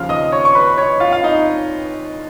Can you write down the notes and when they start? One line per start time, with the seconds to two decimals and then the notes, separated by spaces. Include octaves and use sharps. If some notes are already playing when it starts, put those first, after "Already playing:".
Already playing: D#2 C#3 F3 F5 F6
0.09 D#5 D#6
0.32 C#5 C#6
0.45 C#6
0.55 B4 B5
0.78 C#5 C#6
1.00 F4 F5
1.12 F5
1.24 D#4 D#5